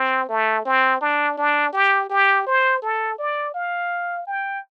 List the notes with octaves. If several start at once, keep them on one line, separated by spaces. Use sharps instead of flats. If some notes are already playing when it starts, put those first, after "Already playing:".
Already playing: C4
A3
C4
D4
D4
G4
G4
C5
A4
D5
F5
G5